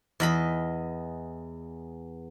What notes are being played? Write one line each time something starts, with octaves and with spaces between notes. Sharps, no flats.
E2 D#5 B5